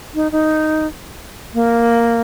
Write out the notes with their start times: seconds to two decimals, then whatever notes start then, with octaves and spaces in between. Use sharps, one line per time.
0.15 D#4
0.32 D#4
1.54 A#3